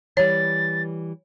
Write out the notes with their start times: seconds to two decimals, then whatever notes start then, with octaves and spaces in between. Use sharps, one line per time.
0.17 E3 G3 C#5 A6